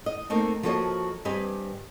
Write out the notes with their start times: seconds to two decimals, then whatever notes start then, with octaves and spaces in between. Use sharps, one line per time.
0.06 D#5
0.30 A3 A#3 C4 D#4
0.63 F3 A#3 F#4 A4 C#5 D#5
1.25 G2 C4 G4 B4 D#5 G#5